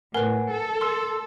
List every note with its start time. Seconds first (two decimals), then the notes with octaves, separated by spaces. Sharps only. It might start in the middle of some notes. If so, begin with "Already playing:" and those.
0.14 A2 A#4 B4 F#5 G#5
0.51 A4
0.81 A#4 C6 E6